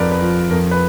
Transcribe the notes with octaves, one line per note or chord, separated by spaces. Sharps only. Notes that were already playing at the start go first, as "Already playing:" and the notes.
Already playing: F2 F3 A#4 B4 D5
B4
F3
F2 A#4
B4